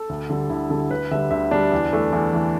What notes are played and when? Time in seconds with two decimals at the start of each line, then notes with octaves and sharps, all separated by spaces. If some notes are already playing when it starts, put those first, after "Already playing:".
Already playing: A4
0.09 D2
0.30 D3 G3
0.50 D2 E4
0.70 D3 G3 A4
0.90 D2 B4
1.11 D3 G3 E5
1.31 D2 E5
1.51 D3 G3 D4
1.72 E2
1.92 E3 A3
2.12 E2
2.33 E3 A3